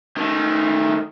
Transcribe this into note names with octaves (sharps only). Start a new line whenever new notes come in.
D#3 A3